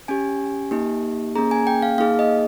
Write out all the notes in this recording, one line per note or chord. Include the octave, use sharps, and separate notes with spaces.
C#4 G4 G#5
A#3 D#4 G4
A#3 C#4 G#4 A#5
G#5
G5
F5
A#3 D#4 G#4 F5
D#5